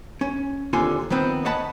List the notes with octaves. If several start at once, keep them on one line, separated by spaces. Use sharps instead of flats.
C#4
D#2 D3 C4 F4 G#5 C6
D#3 F3 B3 C4 B4
C#5 D#5 F#5 A5 B5